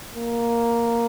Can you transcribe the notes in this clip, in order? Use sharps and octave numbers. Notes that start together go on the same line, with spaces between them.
A#3